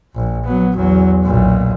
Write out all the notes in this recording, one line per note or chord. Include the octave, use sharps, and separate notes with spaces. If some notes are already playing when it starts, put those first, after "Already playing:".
A#1
F#3 B3
E2 F#3
B1 A#2